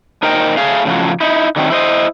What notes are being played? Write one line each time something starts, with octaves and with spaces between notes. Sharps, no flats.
A#2 D#4 A#4 C5 D#5 G5
A3 G#4 F5
A2 C#3 F3 F#3
D#4 E4
D3 D#3 F#3 A3 B3 C4
E4 C5 D#5